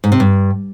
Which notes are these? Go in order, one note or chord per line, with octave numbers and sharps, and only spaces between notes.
G#2
C3
G2